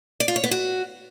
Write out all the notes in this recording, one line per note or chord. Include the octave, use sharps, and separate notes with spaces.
D5
F4
C#5
B3
F#4